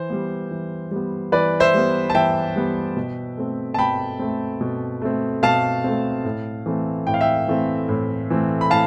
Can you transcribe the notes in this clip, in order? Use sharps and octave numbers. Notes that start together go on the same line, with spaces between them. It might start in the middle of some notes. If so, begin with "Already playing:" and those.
Already playing: E3 C5
G3 B3
E3
G3 B3
E3 B4 D5
C5 E5
G3 B3
A5
E3 E5 G5
G3 B3
B2
A3 C4
A5
B2 G5 B5
A3 C4
B2
A3 C4
B2 F5 A5
A3 C4
A2
E3 A3 C4
A2 G5
F5
E5 G5
E3 A3 C4
A2
E3 A3 C4
B5
A2 F5 A5